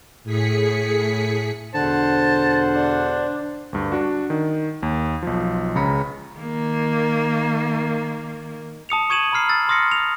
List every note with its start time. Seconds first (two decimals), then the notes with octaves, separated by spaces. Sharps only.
0.24 A2 G#4 B6 C#7
1.74 E2 B2 D3 C5 F#5 A5
2.74 D4
3.73 D2 G2
3.92 D4 F#4
4.30 D#3
4.83 D#2
5.22 B1 F3
5.75 C#2 C#3 A#5 B5 C#7
6.35 D#3 A#3
8.89 A5 D#6 C#7 F7
9.10 C#6 D#6 G#6 D#7 E7 F#7
9.32 A#5 B5 D#6 F6 C7
9.49 E6 A6
9.69 C6 D#6 F6 A#6 C7 C#7
9.92 F7